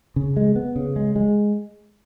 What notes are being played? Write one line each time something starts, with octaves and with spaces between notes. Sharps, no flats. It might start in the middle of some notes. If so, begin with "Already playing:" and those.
C#3
G#3
B3
C#3
G#3
G#3